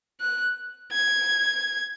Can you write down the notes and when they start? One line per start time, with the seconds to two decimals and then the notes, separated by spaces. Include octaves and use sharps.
0.20 F#6
0.92 G#6